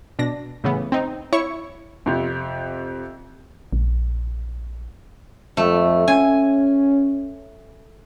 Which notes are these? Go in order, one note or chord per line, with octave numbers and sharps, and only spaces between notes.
B2 D4 A#6
A2 C#3 E3 B3
C4 D#4
E4 C#5 C#6 C#7
F2 C3
A#1
F2 A3
C#4 G#5